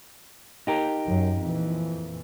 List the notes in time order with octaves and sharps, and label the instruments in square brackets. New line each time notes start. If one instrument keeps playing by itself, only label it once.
[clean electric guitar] D#4 G4 A#4
[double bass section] F#2
F2 A#2 E3